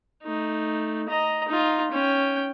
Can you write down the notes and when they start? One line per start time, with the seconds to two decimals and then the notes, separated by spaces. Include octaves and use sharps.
0.23 A3 D#4
1.09 D#5 A#5
1.48 D#4 F4
1.91 C#4 G5